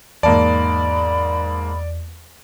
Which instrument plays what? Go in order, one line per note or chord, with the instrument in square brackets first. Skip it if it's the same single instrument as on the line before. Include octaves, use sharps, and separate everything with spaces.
[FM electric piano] E2 [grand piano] G#2 A#3 A5 [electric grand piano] D5 [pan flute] B5